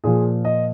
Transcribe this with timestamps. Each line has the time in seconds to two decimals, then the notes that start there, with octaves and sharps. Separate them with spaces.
0.04 A#2 F3 G#4
0.45 D#5